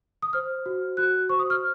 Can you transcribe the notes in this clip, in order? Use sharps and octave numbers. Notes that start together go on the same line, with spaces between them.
D#6
C5 F6
F#4
F#4 F#6
C5 C#6
D#6
F6